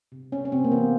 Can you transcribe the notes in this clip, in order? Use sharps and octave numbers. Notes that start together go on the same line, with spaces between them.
C3
C3 C#4
C#4
C3 C4
A#3
E3 B3